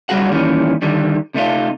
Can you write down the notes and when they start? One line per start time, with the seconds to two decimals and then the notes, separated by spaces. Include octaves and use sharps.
0.09 B1 F#2 G3 F#4 G#4 F#5
0.32 A#2 D#3 E3 G3 C#4
0.82 D3 D#3 G3
1.34 C3 A3 D#4 F4